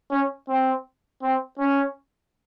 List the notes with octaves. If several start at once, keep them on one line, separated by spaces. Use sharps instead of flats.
C#4
C4
C4
C#4